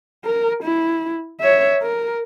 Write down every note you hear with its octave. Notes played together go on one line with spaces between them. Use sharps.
A#4
E4
C#5 E5
A#4